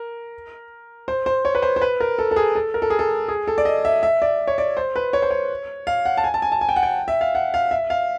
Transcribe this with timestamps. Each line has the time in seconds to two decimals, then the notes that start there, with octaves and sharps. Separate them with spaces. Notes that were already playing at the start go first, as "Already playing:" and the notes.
Already playing: A#4
1.08 C5
1.26 C5
1.45 C#5
1.55 B4
1.62 C5
1.76 C5
1.82 B4
2.00 A#4
2.18 A4
2.31 A4
2.36 G#4
2.55 A4
2.74 A#4
2.82 A4
2.90 G#4
2.99 A4
3.28 G#4
3.47 A4
3.58 D5
3.65 D#5
3.85 E5
4.03 E5
4.22 D5
4.47 C#5
4.58 D5
4.77 C5
4.96 B4
5.13 C#5
5.22 C5
5.31 C#5
5.87 F5
6.05 F#5
6.17 A5
6.24 G#5
6.34 A5
6.42 G#5
6.52 A5
6.61 G#5
6.69 G5
6.76 F#5
6.83 G5
7.08 E5
7.21 F5
7.35 F#5
7.54 F5
7.71 E5
7.90 F5